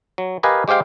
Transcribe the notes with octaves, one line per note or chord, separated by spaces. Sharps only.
F#3
G4 A#4 B4 D#5 F5 G#5
G#3 G4 C5 F5 G5